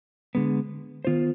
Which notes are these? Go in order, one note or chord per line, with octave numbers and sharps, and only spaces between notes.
D3 G#3 B3
D#3 B3 F4 C5